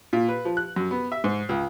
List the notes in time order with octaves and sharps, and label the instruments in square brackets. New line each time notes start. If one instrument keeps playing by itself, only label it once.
[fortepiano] A#2
B4
F3
F#6
F#2
B3
E5
G#2
C#2